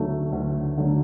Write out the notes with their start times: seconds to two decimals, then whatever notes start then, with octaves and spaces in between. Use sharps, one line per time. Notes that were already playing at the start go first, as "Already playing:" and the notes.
Already playing: D2 D3 F#3 A3
0.32 D2
0.77 D3 F#3 A3